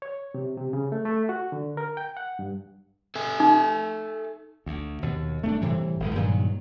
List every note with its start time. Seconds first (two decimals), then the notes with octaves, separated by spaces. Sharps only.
0.02 C#5
0.34 C3
0.57 C3
0.73 C#3
0.92 A3
1.05 A3
1.29 F#4
1.52 D3
1.77 A#4
1.97 G5
2.17 F#5
2.39 G2
3.15 A4 E5 G#5
3.40 D#4
4.66 D2
5.03 D#2 B2
5.44 A3 C4 D4
5.61 A2 C3 E3 G3
6.00 F1 D#3 G#3
6.15 G2 A#2 D#3 F#3